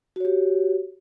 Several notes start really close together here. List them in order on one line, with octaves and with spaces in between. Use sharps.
F#4 C#5 G4